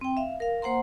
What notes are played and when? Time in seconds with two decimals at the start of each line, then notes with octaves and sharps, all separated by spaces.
0.01 C4 G5
0.17 E5 F5
0.40 A#4 F5
0.62 A#3 C5 F#5 A#5 C6